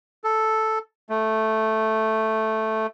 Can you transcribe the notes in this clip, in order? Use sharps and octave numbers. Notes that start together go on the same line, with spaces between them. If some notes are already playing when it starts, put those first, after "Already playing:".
A4
A3